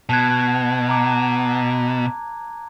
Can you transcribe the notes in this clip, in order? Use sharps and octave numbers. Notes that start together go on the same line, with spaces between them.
B2 A5 F#6 G#6
A#5 D6